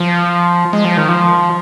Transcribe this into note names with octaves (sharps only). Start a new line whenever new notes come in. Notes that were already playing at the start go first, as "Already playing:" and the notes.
Already playing: F3
G#3
F3
D#3
F3